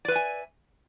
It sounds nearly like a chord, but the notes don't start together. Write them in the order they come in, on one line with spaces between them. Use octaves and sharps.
D5 B4 E5 G#5